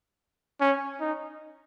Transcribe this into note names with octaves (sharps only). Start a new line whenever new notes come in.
C#4
D#4